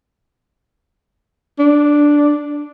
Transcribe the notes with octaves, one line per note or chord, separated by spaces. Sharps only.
D4